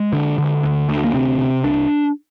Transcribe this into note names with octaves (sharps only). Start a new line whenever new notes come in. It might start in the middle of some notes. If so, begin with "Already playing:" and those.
Already playing: G#3
D3
D3
D2
D2
A#3
C3 C4
C3
C2 D4